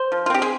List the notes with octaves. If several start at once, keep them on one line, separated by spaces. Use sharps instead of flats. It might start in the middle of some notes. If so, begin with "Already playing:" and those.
Already playing: C5
F3
F4
C4 G4
G#4